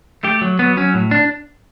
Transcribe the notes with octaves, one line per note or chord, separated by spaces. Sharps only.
A3 G4
F#3
F#3 B3
F#3 C#4
A2
D4